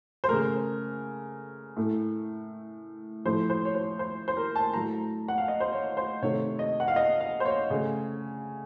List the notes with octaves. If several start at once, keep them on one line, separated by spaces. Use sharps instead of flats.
C5
C#3 A3 A#4
A2 A3
A2 F3 A3 C5
C5
C#5
C5
C5
C5
A#4
A5
A2 F#3 A3 A#5
F#5
F5
D#5
C5
C#5
C5
C3 D#3 A3 C#5
D#5
F#5
F5
D#5
F5
C5
C#5
C#3 A3